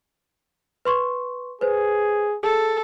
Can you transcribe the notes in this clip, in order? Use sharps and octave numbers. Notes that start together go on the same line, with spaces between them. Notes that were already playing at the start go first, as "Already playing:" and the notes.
B4 C6 C#6
G#4 B4 C5
G#4 A4